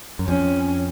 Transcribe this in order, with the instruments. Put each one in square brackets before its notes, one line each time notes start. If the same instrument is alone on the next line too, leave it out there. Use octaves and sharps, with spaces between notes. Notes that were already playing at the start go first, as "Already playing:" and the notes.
[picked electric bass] F#2
[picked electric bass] F2 [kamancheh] C#4